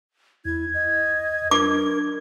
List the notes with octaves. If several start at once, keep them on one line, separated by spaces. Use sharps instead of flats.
E2 E4 G#6
D#5
D4 A#4 D6